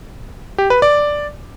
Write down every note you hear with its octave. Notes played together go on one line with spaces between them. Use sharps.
G4
B4
D5